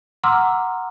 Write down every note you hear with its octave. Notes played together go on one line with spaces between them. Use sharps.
F#5 A#5 C6 D6 E6 F6